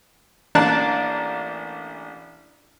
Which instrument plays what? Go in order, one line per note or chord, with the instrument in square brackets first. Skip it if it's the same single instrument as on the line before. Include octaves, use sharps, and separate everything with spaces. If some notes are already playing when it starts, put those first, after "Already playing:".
[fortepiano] A1 A#3 D4 D5 A5 F#6